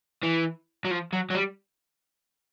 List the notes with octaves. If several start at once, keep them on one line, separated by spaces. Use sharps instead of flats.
E3
F#3
F3
F#3
F#3
G3